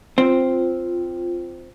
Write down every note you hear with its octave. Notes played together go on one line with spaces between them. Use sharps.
C4 F4